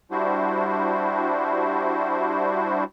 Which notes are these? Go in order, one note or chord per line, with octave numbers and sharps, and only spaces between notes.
G3 D4 E4 F#4 C5